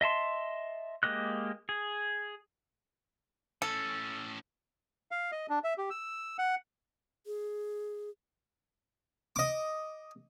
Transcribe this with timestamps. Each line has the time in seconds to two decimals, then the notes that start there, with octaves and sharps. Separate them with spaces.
0.01 D#5 E5 A5 C6
1.03 G#3 A#3 G4 D#5 F#6
1.69 G#4
3.62 A2 C#4 A4
5.11 F5
5.32 D#5
5.49 D4
5.64 E5
5.78 G4
5.90 E6
6.39 F#5
7.26 G#4
9.36 D#5 D6